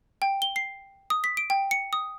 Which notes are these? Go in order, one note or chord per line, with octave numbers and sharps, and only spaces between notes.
G5
G7
C7
D#6
B6
D7
G5
C#7
D#6